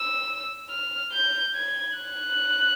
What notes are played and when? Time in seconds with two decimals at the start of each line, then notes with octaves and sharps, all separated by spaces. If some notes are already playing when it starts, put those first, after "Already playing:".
Already playing: E6
0.70 F6
1.12 G6
1.56 G#6
1.98 F#6